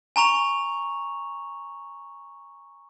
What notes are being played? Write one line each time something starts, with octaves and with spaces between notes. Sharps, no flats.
G#5 A#5 C#6 F7